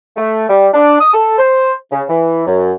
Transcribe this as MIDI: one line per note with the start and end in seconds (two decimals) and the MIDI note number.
0.17 0.46 57
0.49 0.67 55
0.74 1.00 62
1.01 1.12 87
1.13 1.35 69
1.38 1.73 72
1.92 2.03 49
2.09 2.42 52
2.46 2.73 42